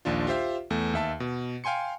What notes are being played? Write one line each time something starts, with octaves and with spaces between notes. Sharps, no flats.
A#1 D#2 D4 F4
F4 G4 C5 E5 F5
E2 A3
D#2 E5 A5
B2
F5 G5 G#5 C6 C#7